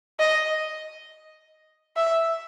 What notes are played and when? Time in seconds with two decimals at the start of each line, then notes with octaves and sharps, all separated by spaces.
0.19 D#5
1.96 E5